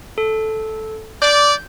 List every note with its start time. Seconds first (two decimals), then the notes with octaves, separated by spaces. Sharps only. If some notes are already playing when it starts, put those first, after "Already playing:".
0.18 A4
1.22 D5 G6